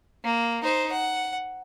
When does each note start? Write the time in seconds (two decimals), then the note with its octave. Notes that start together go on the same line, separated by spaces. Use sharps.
0.24 A#3
0.64 D#4 C5
0.92 F#5